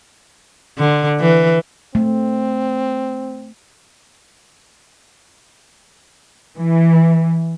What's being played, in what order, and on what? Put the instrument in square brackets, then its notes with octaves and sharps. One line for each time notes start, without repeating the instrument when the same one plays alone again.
[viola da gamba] D3
E3
[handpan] A3 [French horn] C4
[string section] E3